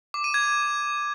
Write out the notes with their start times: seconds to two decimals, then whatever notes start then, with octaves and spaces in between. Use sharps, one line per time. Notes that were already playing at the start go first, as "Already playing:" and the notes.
0.14 D6
0.24 D#7
0.34 G#6